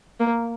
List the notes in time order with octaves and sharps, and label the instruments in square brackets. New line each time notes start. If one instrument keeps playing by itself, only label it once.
[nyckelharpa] A#3